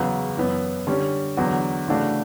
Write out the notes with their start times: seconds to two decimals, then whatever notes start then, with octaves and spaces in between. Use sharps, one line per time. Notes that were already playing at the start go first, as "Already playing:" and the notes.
Already playing: E2 C#3 F#3 B3 F#4
0.37 F#2 E3 B3
0.87 D3 G3 C#4
1.37 E2 D3 F#3 B3 F#4
1.88 C#3 E3 A3 D4 F#4